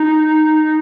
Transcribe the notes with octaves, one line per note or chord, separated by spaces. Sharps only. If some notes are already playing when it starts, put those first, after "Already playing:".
Already playing: D#4